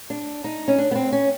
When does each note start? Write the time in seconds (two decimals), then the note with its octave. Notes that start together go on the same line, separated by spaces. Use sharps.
0.10 D4
0.44 D#4
0.68 C#4
0.78 D4
0.91 B3
0.95 C4
1.12 C#4